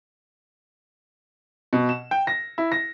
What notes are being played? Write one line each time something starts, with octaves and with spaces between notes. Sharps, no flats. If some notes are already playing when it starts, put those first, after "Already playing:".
B2
E7
G5
A#6
E4
A#6